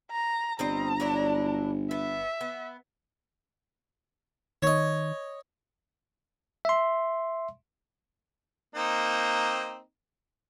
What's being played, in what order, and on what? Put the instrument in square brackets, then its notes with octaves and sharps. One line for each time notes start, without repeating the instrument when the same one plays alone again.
[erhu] A#5
[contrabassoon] G1 [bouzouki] G3 C4 D#5 [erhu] A#5
[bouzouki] F#3 D4 E4
[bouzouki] B3 [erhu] E5
[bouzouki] B3
[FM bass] D#3 [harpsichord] C#5 D#5
[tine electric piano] E5 C6
[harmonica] A#3 C4 D#4